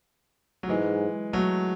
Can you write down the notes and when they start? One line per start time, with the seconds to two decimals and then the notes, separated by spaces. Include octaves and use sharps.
0.63 F#3
0.69 G#2 E3 G#3
1.33 F#3 A3